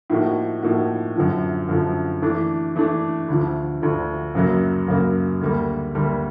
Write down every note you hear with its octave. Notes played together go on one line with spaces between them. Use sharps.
A2 F3 A#3 D#4 F#4
A2 F3 A#3 D#4 F#4
F#2 D3 F3
F#2 D3 F3
E3 A3 D4
E3 A3 D4
D2 D3 F3
D2 D3 F3
F#2 C#3 F#3 A#3
F#2 C#3 F#3 A#3
D2 D3 G3 A#3
D2 D3 G3 A#3